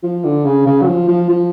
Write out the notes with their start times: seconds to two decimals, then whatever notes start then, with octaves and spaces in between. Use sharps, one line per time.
0.03 F3
0.24 D3
0.45 C#3
0.67 C#3
0.82 F#3
0.88 F3
1.08 F3
1.29 F3